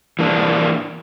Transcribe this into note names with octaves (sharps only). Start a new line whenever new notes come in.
E3 A#3 D4